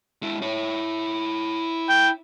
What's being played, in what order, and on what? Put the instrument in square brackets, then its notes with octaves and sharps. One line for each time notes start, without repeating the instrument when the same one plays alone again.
[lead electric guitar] G#3 E4
E4 C#5
[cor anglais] G5